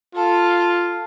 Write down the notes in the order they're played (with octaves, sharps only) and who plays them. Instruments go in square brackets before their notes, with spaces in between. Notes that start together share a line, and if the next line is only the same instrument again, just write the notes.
[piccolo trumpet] F4 [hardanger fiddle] A4